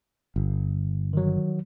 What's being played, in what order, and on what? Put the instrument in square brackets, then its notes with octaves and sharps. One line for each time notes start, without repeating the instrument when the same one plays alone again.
[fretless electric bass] G1
[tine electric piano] D#3 F#3